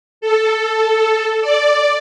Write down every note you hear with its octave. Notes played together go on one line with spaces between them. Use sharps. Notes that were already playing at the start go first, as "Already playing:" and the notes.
A4
D5